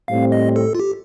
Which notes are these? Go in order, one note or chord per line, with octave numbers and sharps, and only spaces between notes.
A2 G3 C4 F5
D#5
A4
F4
G4